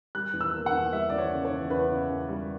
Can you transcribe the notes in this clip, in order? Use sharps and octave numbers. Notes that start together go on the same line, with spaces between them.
G3 F#6
E2
E6
A#3
F#5
E2
G3 E5
E2 D5
C#5
C#3
C#5
E2
E2 B4
C#3
E2
G3